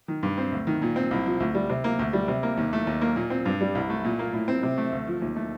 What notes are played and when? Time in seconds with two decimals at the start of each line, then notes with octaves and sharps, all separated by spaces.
0.08 D#3
0.23 G2
0.38 C4
0.52 D2
0.67 D#3
0.82 A#2
0.96 C4
1.11 C2
1.26 F3
1.40 D2
1.55 G3
1.70 C3
1.84 A#3
1.99 D2
2.13 G3
2.28 C3
2.43 A#3
2.57 D#2
2.73 A3
2.87 D#2
3.01 A#3
3.16 A#2
3.30 C4
3.46 G2
3.61 G3
3.75 C2
3.90 A3
4.04 A#2
4.19 A#3
4.33 A2
4.48 C4
4.63 C3
4.78 A3
4.92 D2
5.07 F3
5.21 D#2
5.36 A3